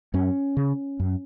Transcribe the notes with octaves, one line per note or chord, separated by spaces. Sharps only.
F#2 C#4
C#3
F#2